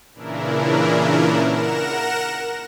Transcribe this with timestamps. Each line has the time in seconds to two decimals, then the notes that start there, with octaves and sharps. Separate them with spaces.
0.14 A#2 C#3 E3 D4 E4 A#4
1.43 A#4 F#5 A#6 E7